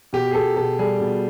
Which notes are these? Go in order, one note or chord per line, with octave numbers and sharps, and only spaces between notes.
B2 G4
G#4
B2 A4
B2 A4
G3 G#4
B2